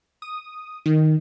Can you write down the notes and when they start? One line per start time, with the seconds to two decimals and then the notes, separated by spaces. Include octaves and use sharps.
0.22 D#6
0.86 D#3